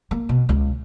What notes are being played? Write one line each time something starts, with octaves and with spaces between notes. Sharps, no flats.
A#3
B2
C#2